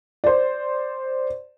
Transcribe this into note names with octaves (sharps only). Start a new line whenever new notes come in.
C5 D5